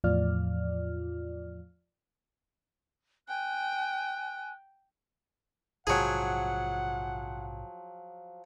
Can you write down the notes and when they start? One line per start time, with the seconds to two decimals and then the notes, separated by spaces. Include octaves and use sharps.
0.04 E2 A2 F3 F4 D5 F6
3.29 G5 G#5 F#6
5.87 A#1 G#2 C3 F3 F#3 G#4 F#5 G5